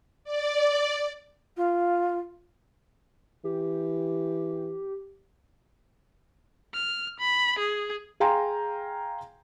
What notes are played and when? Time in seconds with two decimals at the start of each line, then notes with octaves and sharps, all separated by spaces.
0.24 D5
1.57 F4
3.44 E3 G4
6.74 F6
7.20 B5
7.59 G#4
8.20 G#4 F5 G5 G#5 A#5 C6